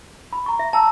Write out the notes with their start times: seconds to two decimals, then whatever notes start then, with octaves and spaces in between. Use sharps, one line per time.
0.33 B5
0.46 A#5 C#6
0.59 E5
0.73 G5 A5 A#5 E6